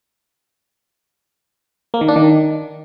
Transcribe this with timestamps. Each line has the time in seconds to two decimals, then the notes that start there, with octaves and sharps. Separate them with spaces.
1.94 A#3
2.01 D#3
2.08 D4
2.16 D#3